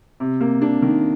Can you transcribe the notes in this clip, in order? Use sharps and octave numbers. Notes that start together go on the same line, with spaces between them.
C3
A#3
D4
D#3